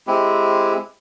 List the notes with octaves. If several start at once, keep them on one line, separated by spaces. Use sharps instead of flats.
G#3 C4 E4 G4